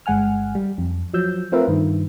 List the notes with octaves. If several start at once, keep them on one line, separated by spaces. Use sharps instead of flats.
G1 G#3 F#5 G#5 F6
G3
F2
F3 F#3 E6 G6
A3 C4 F4 A#4 B4 E5
G2 D#3